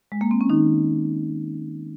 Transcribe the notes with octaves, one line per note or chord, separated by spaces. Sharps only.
G#3
A#3
C4
C#4
D#3 D#4